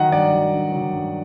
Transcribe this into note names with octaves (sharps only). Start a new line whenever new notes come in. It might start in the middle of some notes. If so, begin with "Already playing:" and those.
Already playing: D#3 F#3 D#5 F#5
G2 D5
D#3 F#3
G2
D#3 F#3
G2